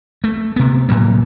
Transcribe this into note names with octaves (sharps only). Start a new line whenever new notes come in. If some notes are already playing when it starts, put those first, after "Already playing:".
A3
C3 B3
A2 C3 F#3 A#3